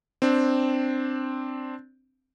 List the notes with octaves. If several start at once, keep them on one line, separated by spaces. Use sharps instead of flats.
C4 D4